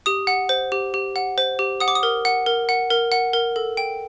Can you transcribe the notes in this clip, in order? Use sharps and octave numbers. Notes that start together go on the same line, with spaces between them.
G4 D#6
F#5
C5
G4
G4
F#5
C5
G4
F#5 D#6
D6
D#6
A#4
F#5
A#4
F#5
A#4
F#5
A#4
A4
G5